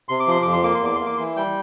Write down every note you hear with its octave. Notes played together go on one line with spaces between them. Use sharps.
C3 C6
D6
F3 C6
F2 D6
C6
A#3 D6
C6
E2 D6
C6
A#3
D6
E3 C6
G3 G5